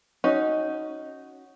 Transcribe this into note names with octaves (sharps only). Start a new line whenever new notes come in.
C#4 D#4 F#4